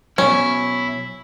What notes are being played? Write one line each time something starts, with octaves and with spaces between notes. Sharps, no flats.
B2 F#3 C#4 E4